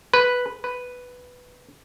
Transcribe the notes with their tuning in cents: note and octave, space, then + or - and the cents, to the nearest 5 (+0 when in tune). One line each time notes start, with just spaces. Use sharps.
B4 +0
B4 +5